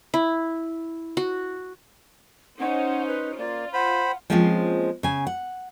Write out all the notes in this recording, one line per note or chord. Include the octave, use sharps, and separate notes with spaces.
E4
F#4
C#4 D#4 C5 F#5
B4
A#3 F4 D5
C5 F#5 B5
F3 G#3 A#3 C4 C#4 F4
C#3 G#5
F#5